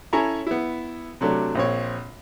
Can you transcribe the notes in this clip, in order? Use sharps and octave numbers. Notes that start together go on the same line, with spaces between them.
C#4 E4 A4 C#5 G#5 A#5
B3 E4
C3 F#3 A3 D4
A#1 C4 C#5